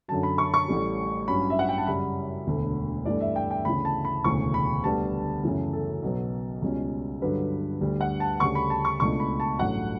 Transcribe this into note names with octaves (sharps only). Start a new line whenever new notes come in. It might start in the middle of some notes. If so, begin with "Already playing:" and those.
F#2 D3 F#3 A5
B5
C#6
C#6
A1 A2 G3
G2 F#3 C#4 B5
E5
F#5
G5
A5
F#2 C#3 G3 B5
E1 D2 D3 A3
G2 E3 A3 D5
E5
G5
G5
D2 C#3 E3 B5
A5
B5
E1 D2 C#3 E3 C#6
B5
D2 D3 G3 B3 A5
F#2 C#3 E3 A3
A4
B1 B2 F#3 B3
C#2 B2 G3 C#4
G2 D3 F#3 B4
D2 D3 G3
F#5
A5
D2 C#3 G3 C#6
B5
A5
C#6
C#2 B2 A3 D4 C#6
B5
A5
A1 G2 F#3 A3 F#5